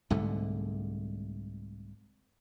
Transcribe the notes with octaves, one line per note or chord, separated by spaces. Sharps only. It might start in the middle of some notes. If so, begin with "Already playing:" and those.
C2 G#2 D3 A3